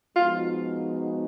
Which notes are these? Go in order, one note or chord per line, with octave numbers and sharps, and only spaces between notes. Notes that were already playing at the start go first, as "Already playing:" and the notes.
F3 G#3 B3 D#4 F4 F#4